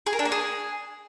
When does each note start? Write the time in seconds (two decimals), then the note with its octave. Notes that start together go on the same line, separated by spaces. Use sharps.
0.06 G#4
0.13 A#4
0.19 D4
0.25 A#3
0.32 G#4